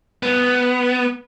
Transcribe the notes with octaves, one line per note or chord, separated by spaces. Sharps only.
B3